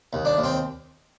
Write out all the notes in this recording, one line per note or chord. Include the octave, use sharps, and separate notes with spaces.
D#2
D4
D#2
C4